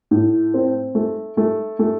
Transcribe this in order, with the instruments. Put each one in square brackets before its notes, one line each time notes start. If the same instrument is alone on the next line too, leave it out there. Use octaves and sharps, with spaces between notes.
[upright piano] A2
C4
A3
A3
A3